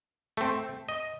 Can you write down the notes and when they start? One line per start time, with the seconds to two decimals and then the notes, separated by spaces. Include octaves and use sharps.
0.37 A3 C4
0.89 D#5